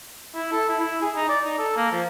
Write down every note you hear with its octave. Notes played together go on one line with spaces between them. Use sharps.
E4
A4
E4
E4
G#4
D#4
D5
D#4
A4
A#3
F3